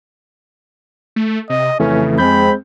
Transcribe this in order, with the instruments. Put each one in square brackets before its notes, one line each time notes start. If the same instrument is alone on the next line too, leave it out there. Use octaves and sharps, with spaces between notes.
[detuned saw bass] A3
[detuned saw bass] C3 [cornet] D#5
[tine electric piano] F2 E3 A3 [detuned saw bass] C#3 [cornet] C#4
[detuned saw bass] F2 [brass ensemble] G#3 C4 [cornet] B5 [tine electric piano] G6